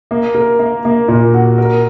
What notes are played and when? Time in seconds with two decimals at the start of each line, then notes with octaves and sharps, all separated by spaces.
0.11 A#3
0.35 A#4
0.59 A#3
0.85 A#3
1.08 A#2
1.34 F#4
1.58 A#4